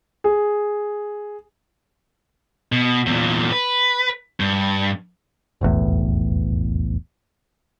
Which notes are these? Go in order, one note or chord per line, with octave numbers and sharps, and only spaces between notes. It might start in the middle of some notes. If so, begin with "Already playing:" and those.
G#4
B2
E2 A#2
B4
G2
F1 B1 E2 A2